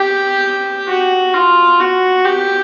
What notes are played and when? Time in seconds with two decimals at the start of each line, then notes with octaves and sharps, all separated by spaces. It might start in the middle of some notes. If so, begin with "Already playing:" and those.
Already playing: G4
0.87 F#4
1.33 F4
1.80 F#4
2.25 G4